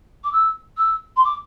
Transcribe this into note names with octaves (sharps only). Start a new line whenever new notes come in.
D6
E6
E6
C6
D6